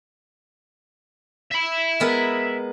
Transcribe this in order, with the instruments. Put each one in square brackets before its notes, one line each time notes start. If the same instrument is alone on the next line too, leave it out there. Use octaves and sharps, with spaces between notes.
[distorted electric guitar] E5 B5
[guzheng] G#3 B3 A#4